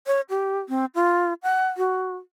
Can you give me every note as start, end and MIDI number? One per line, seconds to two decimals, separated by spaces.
0.07 0.21 73
0.30 0.59 67
0.69 0.85 60
0.95 1.34 65
1.43 1.67 78
1.77 2.15 66